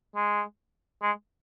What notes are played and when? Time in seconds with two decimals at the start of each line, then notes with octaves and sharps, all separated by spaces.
0.16 G#3
1.02 G#3